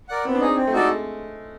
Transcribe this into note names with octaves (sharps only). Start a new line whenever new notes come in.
A#4 D5 F#5
B3 C4
D4
D#4 G#4
C4
A3
G#3 D#4 F#4 A4 D5